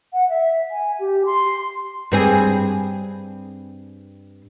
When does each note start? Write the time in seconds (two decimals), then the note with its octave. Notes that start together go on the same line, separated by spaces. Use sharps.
0.13 F#5
0.29 E5
0.71 G#5
1.00 G4
1.26 C6
2.12 G2 C4 G#4